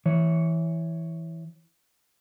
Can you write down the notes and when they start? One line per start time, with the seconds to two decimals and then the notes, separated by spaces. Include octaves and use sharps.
0.06 E3 C#5